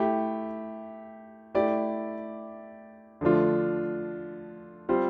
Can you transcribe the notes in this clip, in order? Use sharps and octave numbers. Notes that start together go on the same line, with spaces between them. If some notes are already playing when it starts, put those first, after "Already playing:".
Already playing: A3 E4 G4
A3 E4 G4 D5
D3 F3 A3 D4 F4
G3 C4 F4 C5